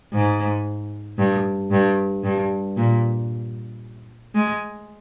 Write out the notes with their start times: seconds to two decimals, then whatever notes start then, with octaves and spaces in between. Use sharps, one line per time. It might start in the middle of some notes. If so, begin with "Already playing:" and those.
0.13 G#2
1.18 G2
1.72 G2
2.24 G2
2.77 A#2
4.35 G#3